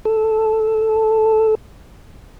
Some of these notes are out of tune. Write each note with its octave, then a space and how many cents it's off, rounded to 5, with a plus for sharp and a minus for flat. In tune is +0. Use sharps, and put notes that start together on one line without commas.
A4 -5